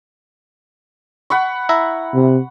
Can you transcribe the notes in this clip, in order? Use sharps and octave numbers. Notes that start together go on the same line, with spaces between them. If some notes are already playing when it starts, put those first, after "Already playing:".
F#5 B5 C#6
E4 E5 A#5
C3